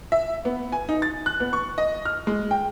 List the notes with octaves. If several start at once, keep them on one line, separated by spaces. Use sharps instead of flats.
E5
B3
G#5
D#4
A6
F#6
B3
C#6
D#5
F6
G#3
G5